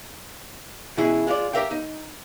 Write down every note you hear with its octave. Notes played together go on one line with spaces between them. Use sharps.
B2 E3 C#4 E4 G#4
G#3 F4 C5 D5
G4 G#4 A#4 E5 F5 G5
D#4